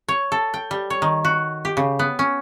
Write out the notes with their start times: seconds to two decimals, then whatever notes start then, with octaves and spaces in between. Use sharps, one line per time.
0.08 C#5
0.32 A4
0.54 G5
0.71 G3
0.90 C#5
1.02 D#3
1.25 F#4
1.65 G4
1.77 C#3
1.99 B3
2.19 C#4